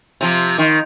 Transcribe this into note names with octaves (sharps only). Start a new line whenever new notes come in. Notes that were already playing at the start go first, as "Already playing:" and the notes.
C3 F3
D#3